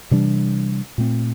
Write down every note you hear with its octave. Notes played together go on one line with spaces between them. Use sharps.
C3 E3 G3 D4
A#2 A3 C4